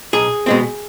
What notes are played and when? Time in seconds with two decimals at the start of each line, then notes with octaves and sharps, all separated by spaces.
0.13 B1 G#4
0.46 B2 G#3 C4